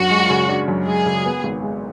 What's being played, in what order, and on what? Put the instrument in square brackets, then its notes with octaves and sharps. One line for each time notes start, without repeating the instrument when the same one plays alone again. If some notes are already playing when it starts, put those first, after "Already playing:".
Already playing: [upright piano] F#2 D4 [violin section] F#4
[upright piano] G#3
C#3
D4
F#2
[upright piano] G#3 [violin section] G#4
[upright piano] C#3
B3
G#1
G#3